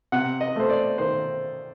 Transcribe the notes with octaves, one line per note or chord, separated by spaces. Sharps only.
C3 F#5
D#5
A3 C5
D5
D#3 C5